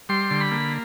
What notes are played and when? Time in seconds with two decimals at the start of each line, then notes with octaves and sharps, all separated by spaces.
0.09 G3 C6
0.31 D3
0.41 B5
0.51 A#3